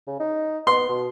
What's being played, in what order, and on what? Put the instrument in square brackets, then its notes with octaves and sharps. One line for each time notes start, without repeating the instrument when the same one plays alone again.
[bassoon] C#3
D#4
[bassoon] B3 [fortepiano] C6
[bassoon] B2